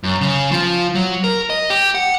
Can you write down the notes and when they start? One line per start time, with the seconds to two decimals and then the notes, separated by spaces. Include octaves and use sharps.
0.03 F#2
0.21 C#3
0.52 F3
0.95 F#3
1.24 A#4
1.50 D#5
1.70 G4
1.95 F#5